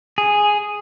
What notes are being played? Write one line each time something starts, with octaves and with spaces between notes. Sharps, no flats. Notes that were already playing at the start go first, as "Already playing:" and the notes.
G#4